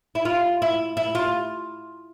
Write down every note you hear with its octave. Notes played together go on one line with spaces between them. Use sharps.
E4
F4
E4
E4
F4